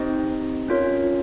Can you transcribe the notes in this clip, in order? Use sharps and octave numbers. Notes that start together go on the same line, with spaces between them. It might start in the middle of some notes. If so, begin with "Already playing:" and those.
Already playing: C4 D#4 G4 C5 D#5
C#4 F4 A#4 C#5